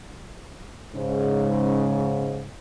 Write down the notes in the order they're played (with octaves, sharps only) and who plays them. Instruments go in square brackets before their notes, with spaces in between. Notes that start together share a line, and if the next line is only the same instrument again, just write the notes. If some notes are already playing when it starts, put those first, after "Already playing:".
[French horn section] G#2 C#3